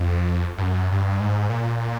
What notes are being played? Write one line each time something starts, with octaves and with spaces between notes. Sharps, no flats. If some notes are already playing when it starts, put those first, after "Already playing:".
Already playing: F2
G2
F#2
G2
G#2
A#2